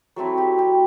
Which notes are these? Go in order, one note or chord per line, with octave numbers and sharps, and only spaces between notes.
F#3 A3 C4 E4 A4
G4
G4